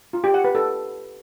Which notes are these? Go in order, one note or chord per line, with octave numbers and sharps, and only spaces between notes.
F4
G4
F#5
B4
A4